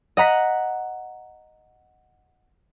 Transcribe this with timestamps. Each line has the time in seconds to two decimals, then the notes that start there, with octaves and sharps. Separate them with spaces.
0.17 D#5 F#5 A#5 B6